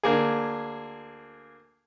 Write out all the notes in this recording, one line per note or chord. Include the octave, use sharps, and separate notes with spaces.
D2 A#3 G#4